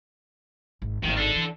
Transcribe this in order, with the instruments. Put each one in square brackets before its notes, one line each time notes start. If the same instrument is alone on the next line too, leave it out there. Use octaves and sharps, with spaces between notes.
[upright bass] G#1
[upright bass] G#1 A2 [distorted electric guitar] D#3
[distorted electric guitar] D4 A4
[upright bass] E3